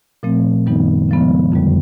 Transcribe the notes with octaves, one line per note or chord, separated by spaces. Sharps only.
A#2 F3 A3 C4
F#2 D#3 G3 B3 D#4
C#3 F3 G#3 B3
F2 D3 G3